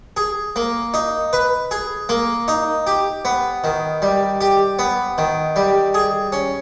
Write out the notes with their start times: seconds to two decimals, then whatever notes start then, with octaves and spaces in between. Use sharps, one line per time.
0.17 G#4
0.56 A#3
0.94 D#4
1.33 B4
1.71 G#4
2.09 A#3
2.48 D#4
2.87 G4
3.25 B3
3.64 D#3
4.02 G3
4.41 G4
4.79 B3
5.18 D#3
5.56 G3
5.94 G#4
6.32 C#4